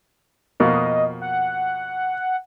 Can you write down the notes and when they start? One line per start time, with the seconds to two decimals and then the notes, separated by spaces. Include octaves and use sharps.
0.60 F2 B2 A#3 D#5
1.21 F#5